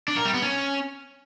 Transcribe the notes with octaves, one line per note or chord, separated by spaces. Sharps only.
D4
A#4
G3
B3
C#4